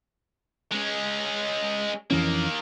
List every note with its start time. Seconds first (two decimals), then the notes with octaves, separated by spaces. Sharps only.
0.71 G#3 C#4
2.11 F2 D#3 E3 A#3 C#4